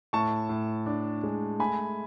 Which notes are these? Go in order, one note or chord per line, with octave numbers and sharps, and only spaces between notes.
A2 A5 C#6
A2
D4
G#3
A3 G#5 B5